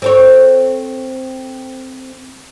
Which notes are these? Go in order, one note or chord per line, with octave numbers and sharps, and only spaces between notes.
C4 A4 C#5